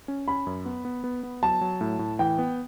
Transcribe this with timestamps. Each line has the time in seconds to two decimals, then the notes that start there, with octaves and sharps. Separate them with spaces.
0.08 C#4
0.28 C#4 B5
0.47 F#2
0.66 B3
0.85 B3
1.04 B3
1.23 B3
1.43 F#3 A5
1.61 F#3
1.81 A2
1.99 A2
2.19 E3 G5
2.38 B3